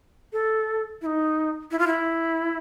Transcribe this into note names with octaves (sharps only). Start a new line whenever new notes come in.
A4
E4
D#4
E4
F4
E4